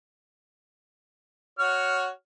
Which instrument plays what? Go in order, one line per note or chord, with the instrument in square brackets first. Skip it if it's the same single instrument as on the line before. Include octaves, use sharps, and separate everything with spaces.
[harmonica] F#4 C#5 F6